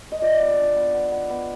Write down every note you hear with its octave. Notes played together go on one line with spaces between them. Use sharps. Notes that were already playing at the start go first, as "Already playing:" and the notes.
D#5
F4 D5
B3
D4
B3
B3
B3
B3